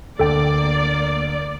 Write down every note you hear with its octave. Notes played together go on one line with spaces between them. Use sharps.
D2 A#3 A4 D5 G5